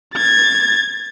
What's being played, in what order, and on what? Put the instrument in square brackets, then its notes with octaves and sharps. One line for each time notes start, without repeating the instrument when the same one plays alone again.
[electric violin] G#6 A6